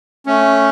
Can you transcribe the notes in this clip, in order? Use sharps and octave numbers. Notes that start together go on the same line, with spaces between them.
A3 C#4